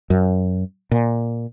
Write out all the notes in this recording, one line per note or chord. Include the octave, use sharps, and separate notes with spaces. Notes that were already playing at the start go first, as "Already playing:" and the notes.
F#2
A#2